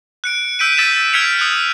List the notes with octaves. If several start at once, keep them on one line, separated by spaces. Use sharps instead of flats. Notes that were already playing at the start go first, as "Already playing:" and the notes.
F#6 C#7 D7
E6 G6 B6 D7 D#7
E6 A6 B6 D#7 E7
F6 G#6 B6 C#7 F7
D#6 F#6